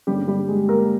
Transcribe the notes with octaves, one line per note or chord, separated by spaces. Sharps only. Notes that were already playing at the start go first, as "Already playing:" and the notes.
G2 D3 G3 A#3 C#4 G4
G3 G4
G#3 G#4
A#3 A#4